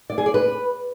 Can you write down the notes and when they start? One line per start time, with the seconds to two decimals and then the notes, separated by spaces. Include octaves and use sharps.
0.10 D5
0.18 G#4
0.26 D5
0.34 B4